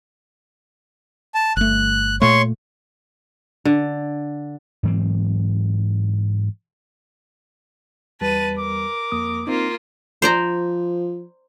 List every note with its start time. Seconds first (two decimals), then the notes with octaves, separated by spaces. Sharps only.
1.35 A5
1.57 G1 A3 F#6
2.22 A#2 A3 C#5 C6 C#6
3.65 D3
4.83 G#2 E3 F#3 C4
8.21 E2 G3 B4 A5 D#7
8.58 A#4 D6
9.12 F2 A#3 D#6
9.47 A#3 C4 D#4 F4
10.22 F3 C5 D5 A#5